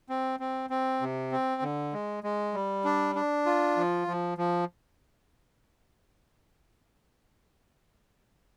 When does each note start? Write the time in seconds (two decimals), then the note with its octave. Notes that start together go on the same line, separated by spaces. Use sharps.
0.09 C4
0.40 C4
0.70 C4
1.01 C3
1.32 C4
1.62 D3
1.93 G#3
2.24 G#3
2.54 G3
2.85 D4
3.15 D4
3.46 F4
3.77 F3
4.08 F3
4.38 F3